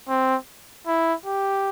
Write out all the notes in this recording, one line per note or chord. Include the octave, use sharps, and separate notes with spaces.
C4
E4
G4